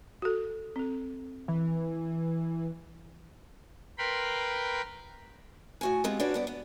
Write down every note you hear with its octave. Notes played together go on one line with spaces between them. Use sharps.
F#4 A4
C4 A4
E3
A#4 B4 G5 B5 C6
A2 F#4 G#5
G#3 B3 C4 F4 G4 G#4
D4 F4 F#4 B4 C#5 D5
G2 B3 D5
B3